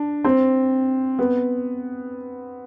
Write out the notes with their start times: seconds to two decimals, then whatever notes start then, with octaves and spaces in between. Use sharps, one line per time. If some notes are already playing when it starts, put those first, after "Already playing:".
Already playing: D4
0.24 C4
1.19 B3